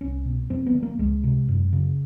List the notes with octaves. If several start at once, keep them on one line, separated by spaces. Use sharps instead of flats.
C2 C#4
B2
F2 C4
B3
D3
A#3
C#2 G#3
C3
F#2
C#3